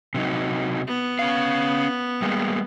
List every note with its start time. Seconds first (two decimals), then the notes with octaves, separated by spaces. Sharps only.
0.14 C3 F#3 D#4
0.87 B3
1.19 C#4 F5
2.22 G3 G#3 A#3